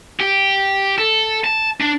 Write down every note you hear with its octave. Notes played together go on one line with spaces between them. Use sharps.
G4
A4
A5
D4